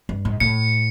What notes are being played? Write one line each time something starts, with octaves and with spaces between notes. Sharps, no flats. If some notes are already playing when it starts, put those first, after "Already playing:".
G2
G#2
A2 C#7